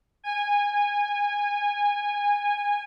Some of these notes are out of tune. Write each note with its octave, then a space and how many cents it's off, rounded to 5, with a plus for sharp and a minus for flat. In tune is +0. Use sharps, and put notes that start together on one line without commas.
G#5 -20